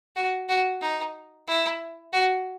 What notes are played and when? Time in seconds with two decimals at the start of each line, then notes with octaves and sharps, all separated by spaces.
0.16 F#4
0.49 F#4
0.81 D#4
1.47 E4
2.13 F#4